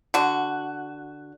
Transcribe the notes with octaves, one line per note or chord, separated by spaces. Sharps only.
D3 F#4